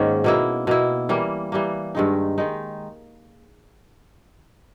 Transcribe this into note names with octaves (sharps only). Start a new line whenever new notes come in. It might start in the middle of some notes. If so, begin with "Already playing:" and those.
Already playing: G#2 D#3 A#3 C#4
B2 A#3 E4
B2 A#3 E4
E3 G3 A#3
E3 G3 A#3
G2 D#3 G#3 D#4
D#3 G#3 D#4